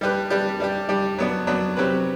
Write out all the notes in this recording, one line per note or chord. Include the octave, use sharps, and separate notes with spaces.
G3 D4 G4 B4
G3 D4 G4 B4
G3 D4 G4
G3 D4 G4
F#3 B3 D4
F#3 B3 D4
C3 F#3 C4 G4 B4